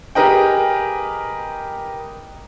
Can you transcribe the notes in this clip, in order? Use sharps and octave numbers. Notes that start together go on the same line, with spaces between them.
G4 G#4 A#4 B4 D#5 G5